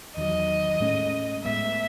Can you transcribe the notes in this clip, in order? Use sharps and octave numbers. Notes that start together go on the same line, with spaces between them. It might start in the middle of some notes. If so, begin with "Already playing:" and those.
E2 D#3 F#3 D#5
A2 G#3 C#4
A2 G#3 B3 E5